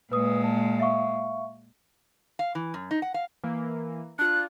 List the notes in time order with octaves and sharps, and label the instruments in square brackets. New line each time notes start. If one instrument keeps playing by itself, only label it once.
[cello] A#2 G#3 [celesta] B4 D#6
[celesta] A5
E5 F5 C#6
[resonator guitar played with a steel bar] F5
E3
F#2
D#4
F#5
F5
[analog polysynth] E3 A#3
[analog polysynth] D4 F4 [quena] F#6